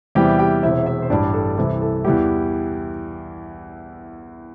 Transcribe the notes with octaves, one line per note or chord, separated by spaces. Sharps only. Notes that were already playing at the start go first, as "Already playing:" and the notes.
E2 C3 E3 G3 G4 G5
G4 G5
E1 E2 C3 E4 E5
E4 E5
C5
A1 G2 G3 D4 D5
A4
C2 C3 E3 A4
A4
E2 E3 G3 G4